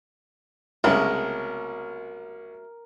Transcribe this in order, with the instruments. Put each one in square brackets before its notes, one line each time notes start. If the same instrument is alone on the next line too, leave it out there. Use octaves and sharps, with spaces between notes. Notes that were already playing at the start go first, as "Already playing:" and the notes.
[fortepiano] C2 C#3 G#3 [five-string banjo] F#3 A3 B3 [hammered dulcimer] A#4